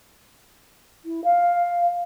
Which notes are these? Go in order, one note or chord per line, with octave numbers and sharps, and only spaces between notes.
E4
F5